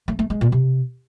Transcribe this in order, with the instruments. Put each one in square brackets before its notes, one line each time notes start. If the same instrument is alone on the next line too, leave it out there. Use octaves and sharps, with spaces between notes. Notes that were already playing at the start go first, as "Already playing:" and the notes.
[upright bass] A3
A3
G#3
A#2
C3